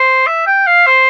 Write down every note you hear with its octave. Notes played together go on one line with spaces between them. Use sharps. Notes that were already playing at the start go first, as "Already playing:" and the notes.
Already playing: C5
E5
G5
F5
C5